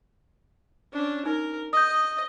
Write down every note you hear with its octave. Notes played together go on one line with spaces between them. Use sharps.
C#4 D4
D#4 A#4
D#5 D#6 G6